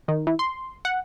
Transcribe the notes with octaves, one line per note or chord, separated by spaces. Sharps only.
D#3
E3
C6
F#5